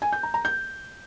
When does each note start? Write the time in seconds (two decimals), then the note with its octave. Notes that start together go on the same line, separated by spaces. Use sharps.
0.02 G#5
0.13 G6
0.23 A#5
0.34 A#5
0.45 G6